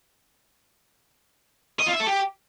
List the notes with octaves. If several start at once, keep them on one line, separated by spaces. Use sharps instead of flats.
D#5
F4
E5
A4
G4